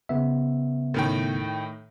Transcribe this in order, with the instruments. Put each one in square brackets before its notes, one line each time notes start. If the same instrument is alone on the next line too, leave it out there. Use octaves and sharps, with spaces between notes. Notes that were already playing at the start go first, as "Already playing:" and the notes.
[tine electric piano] C#3 B3 E5
[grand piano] A2 D#3 G5